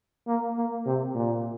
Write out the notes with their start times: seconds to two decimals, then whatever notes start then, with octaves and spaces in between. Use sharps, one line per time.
0.27 A#3
0.56 A#3
0.86 C3
1.15 A#2